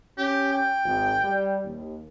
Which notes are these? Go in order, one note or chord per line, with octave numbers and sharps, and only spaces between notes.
C#4 G4
G5
G#1
G3
D#2